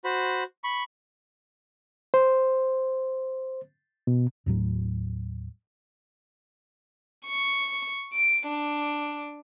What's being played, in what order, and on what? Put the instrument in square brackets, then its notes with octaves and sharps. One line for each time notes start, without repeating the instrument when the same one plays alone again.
[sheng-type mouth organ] F#4 C5 B5
B5 C#6
[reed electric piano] C5
B2
[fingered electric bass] D#2 A2 F#3
[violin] C#6
D7
D4